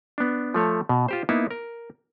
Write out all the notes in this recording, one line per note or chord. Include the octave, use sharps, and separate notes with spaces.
B3 D4
F3 A3 C#5
B2
F4 G4 C5
A#3 B3 D#4 E4
A#4